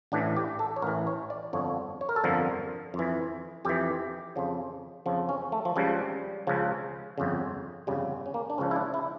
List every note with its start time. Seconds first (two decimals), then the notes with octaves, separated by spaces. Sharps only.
0.12 A1 A2 E3 D4
0.36 G4
0.59 A4
0.76 C#5
0.82 A1 A2 E3 A#4
1.07 C#5
1.30 D5
1.53 G1 F2 D3 F3 C#5
2.01 C#5
2.09 A#4
2.16 A4
2.24 G1 F2 D3 F3 A#4
2.94 F2
2.99 E3
3.65 F2 E3 G4
4.36 F2 C#3 F3
5.06 F2 C#3 F3
5.29 C#4
5.52 A3
5.65 F3
5.76 C#2 C#3 F3 G3
6.47 C#2 C#3 F3
7.18 G1 F2 C#3
7.87 G1 F2 C#3 G3
8.26 C#4
8.34 A#3
8.50 D4
8.58 C#2 C#3 F3 C#4
8.71 E4
8.76 D4
8.94 E4